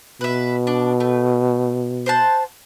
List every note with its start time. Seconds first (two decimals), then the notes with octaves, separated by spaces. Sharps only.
0.21 B2 B4 E5
0.67 D4
1.00 A3
2.06 C5 F#5 A5